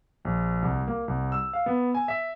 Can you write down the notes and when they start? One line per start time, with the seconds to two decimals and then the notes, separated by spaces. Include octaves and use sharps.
0.25 A#1
0.62 C2
0.87 A#3
1.08 C2
1.32 E6
1.53 F5
1.66 B3
1.95 G#5
2.08 E5